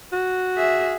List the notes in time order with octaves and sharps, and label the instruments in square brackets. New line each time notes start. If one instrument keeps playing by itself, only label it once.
[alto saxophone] F#4
[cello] G#4 E5